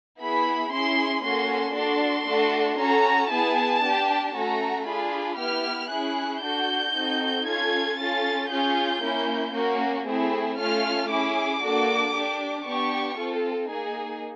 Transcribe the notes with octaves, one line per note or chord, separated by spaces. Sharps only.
B3 E4 G#4 B5
C#4 E4 G#4 C6
A#3 C#4 F#4 A4 C6
D4 F#4 A4 C6
A3 D4 F#4 A4
C#4 F#4 A4 A#5
B3 E4 G#4 A5
D4 G4
A3 C#4 F#4 A4 A#5
D4 F4 G#4 B5
B3 E4 G4 F6
C#4 E4 G#4 F#6
D4 F#4 A4 G6
C4 D#4 F#4 A4
C#4 F4 A4 G#6
C#4 F4 A4 A6
C#4 F4 G#4 G6
A#3 C#4 E4
A#3 C#4 F#4
A3 C4 E4 G#4
A3 C#4 F4 A4 F6
C#4 E4 G#4 D6
A#3 D4 F#4 A4
D4 G4
B3 D4 G4 C#6
C4 F4 A4
A#3 D#4 G#4